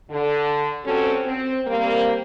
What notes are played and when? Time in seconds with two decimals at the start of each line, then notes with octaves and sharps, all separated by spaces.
0.11 D3
0.85 G3 C4 C#4 F#4 G4 A4
1.26 C4
1.67 G3 A#3 C4